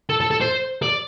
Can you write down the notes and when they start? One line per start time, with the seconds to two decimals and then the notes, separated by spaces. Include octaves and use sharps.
0.10 A4
0.21 A4
0.31 A4
0.41 C5
0.82 D5